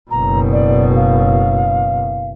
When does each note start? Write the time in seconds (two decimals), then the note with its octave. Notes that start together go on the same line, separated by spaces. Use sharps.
0.11 F#1 B2 A#5
0.52 D5
0.96 F5